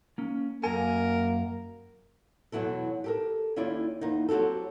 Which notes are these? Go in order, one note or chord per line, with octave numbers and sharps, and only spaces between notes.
A#3 C#4
F#2 A#3 A#4 G#5
E2 B2 F#3 E4 A4
G4 A4 A#4
D#2 C#4 E4 F4 D5
E2 A#3 D#4
F#3 C4 F#4 G4 A4